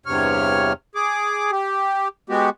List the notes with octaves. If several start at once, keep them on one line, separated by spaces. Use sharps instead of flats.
E2 G2 C3 C#5 F6
G#4 D6
G4
G#3 B3 F#4 G4